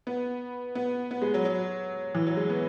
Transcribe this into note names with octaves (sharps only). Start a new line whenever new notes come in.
B3
B3
B3
G#3
F#3
F#3
E3
F#3
G#3
B3